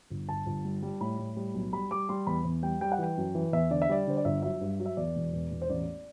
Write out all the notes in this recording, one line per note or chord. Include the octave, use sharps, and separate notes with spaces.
G1
G1 A5
G1
G3
G3
A2 B5
A2
G3
B1
G3 B5
G3 D6
G3 C6
E2 B5
E2
G3 G5
G3 G5
F#5
E3 G5
F#2
E3
E2 E5
D3 D5
E5
G3 D5
D3 C5
D5
G1 E5
F#3 E5
G2
F#3
E5
E2 D5
E1
E2
E1
C5
A1 D5